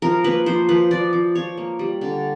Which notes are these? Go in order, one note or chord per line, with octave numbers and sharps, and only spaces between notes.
F3 A#4
A#3 B4
F3 C5
F3 B4
F3 D5
F3
F3 C#5
A#3
G3
D3